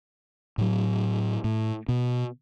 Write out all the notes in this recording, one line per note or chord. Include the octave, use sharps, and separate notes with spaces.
A2 F#3
A2
B2